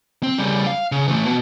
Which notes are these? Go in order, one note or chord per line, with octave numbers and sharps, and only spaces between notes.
C4
C#3 G3
F5
C#3
E3 A3
B2